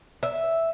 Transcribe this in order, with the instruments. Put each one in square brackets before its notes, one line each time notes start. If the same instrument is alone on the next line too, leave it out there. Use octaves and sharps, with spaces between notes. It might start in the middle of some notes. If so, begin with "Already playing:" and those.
[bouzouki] E5